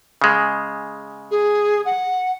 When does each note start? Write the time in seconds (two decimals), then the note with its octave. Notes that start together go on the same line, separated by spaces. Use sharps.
0.22 C#3 G#3
1.30 G#4
1.85 F#5